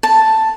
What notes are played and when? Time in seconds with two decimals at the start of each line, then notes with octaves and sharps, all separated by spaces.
0.03 A5